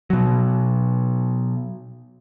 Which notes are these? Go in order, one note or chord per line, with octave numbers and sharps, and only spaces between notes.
B2 F#3